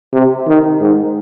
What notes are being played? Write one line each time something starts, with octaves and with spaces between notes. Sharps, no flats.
C3
D#3
G#2